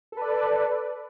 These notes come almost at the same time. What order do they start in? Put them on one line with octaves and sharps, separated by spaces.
A4 B4 D5